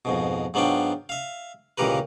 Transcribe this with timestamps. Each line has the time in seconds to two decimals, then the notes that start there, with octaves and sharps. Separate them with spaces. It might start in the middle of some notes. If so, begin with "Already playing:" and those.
0.05 F2 G#2 B2
0.54 G#2 F#3 B3 D4 F4 G5
1.09 E5 F5
1.78 C#2 A#2 E3 G4 A#4 B4